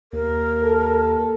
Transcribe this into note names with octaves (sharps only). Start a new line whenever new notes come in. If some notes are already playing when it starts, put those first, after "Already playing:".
D#2 A#4
A4